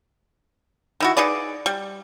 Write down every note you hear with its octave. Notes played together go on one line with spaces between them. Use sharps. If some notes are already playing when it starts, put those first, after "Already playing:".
D#3 E4 F#4
D#4 G#4 B4 D5
G3